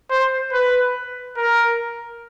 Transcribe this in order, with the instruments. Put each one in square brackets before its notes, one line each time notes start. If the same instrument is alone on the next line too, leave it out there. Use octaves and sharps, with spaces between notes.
[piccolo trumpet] C5
B4
A#4